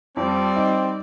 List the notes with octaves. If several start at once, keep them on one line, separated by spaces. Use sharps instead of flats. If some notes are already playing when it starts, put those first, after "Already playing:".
F2 G3 C4 D5
D#4